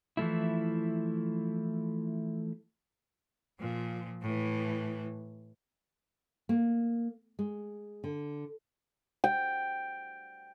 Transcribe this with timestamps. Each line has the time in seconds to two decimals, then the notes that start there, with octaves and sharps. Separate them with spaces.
0.17 E3 F3 A3 E4
3.59 A#2 F3
4.22 A2 E3
6.49 A#3
7.39 G#3
8.04 D3
9.24 G5